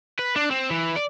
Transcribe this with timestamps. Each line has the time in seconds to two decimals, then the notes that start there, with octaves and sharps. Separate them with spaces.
0.19 B4
0.36 D4
0.51 C4
0.71 E3
0.96 D5